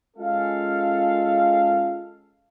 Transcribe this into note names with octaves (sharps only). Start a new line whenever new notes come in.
G#3 C#4 F4 A4 F5